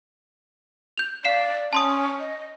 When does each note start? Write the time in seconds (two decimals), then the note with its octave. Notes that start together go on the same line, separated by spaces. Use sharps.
0.97 G6 F7
1.25 D5 F5 C7 E7
1.73 C#4 A5 C6 D#6
2.20 D#5